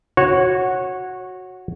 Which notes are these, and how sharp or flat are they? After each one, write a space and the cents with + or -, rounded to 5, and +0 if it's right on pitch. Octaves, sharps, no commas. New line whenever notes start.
F#4 -5 C#5 -15